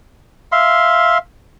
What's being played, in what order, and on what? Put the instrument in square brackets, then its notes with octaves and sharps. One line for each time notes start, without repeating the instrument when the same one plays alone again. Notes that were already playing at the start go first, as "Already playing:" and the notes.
[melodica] E5 F5 C6